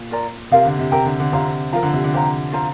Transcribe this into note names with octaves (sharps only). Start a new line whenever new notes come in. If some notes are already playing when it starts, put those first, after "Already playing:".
Already playing: A#2
F4 A#4 D5 A#5
C3 F4 A#4 F5
D3
C3
C3 A#4 G5 A#5
D3
D3
C3 F4 C5 F5 A#5
F3 A#4 F5 A#5
D3
C3
D3
G4 C5 F5 A#5
F4 C5 F5 A#5